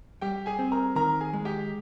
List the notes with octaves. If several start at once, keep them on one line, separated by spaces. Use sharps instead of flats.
G3 G4 G5
G#4 G#5
C4
A#4 A#5
D#3 A#4 A#5
G#4 G#5
G#3
G4 G5